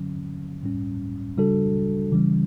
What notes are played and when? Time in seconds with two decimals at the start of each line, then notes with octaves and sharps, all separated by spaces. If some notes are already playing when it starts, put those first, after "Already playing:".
Already playing: D3 F#3 C#4
0.62 A2 G3 C#4
1.37 C#3 G3 D4 F#4 A4
2.12 C#3 E3 G3 C#4